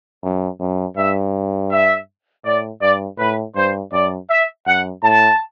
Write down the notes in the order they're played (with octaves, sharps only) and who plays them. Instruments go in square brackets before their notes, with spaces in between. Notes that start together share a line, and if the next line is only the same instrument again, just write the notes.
[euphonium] F#2
F#2
[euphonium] G2 [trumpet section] E5
[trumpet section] E5
[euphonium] A2 [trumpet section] D5
[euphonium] G2 [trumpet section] D5
[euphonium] A2 [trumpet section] B4
[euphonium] G2 [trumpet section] C5
[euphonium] F#2 [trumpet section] D5
[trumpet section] E5
[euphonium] F#2 [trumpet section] F#5
[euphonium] A2 [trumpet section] A5